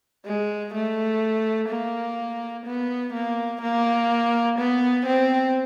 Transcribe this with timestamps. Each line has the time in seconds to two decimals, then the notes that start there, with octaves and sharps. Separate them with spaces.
0.26 G#3
0.75 A3
1.70 A#3
2.66 B3
3.14 A#3
3.62 A#3
4.59 B3
5.07 C4